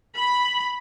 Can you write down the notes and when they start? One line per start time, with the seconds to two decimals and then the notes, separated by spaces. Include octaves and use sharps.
0.16 B5